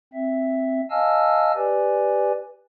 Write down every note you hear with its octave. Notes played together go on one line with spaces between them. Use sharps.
C4 E5
D#5 F5 G#5 A5 E6 F6
G4 B4 D5 G#5